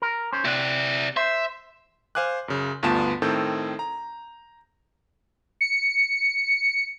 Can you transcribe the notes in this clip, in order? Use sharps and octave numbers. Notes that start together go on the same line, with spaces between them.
A#4
C#4 C5
C3 E4 D5 F#5
C5 E5
C5 F5 G#5 D6 F#6
F#2 C#3
D2 G2 B3 F4 A5 E7
A2 D#3 C4 A4 G6
A#5
C#7